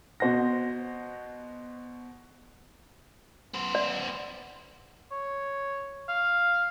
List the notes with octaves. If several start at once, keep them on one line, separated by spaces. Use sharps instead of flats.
B2 F#4 C5 F#5 A#6
B3 C5
D5
C#5
F5